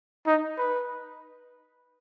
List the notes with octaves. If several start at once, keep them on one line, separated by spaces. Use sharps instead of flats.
D#4
B4